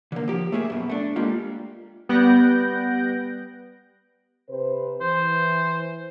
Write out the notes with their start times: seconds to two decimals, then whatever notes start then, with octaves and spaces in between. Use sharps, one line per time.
0.12 D3 A#3
0.28 F3 G4
0.52 A3 A#3 G#4 E5
0.70 F#2 B2
0.89 A3 D4
1.16 G3 G#3 A#3 F4
2.09 G3 B3 F#6 G6 A#6 D7
4.48 C3 B4 C5
5.01 E3 C5